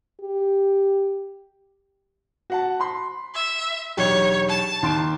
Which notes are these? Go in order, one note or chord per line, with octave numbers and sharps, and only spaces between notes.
G4
F#4 F#5 A5
B5 C6
E5
E1 B1 G4 C#5
A5
D#2 C6 D7